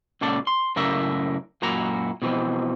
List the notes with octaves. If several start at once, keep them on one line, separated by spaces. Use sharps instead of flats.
C#2 A#2 C#4 A4 D5 A5
C6
F#2 A2 C#3 A#4 D5 E5
F#2 A#2 E4 F#4 A#5
B2 E3 F3 C4